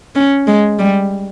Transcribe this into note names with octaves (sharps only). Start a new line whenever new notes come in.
C#4
G#3
G3